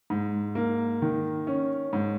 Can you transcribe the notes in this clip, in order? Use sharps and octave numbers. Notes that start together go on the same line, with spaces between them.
G#2
A#3
D#3
C#4
G#2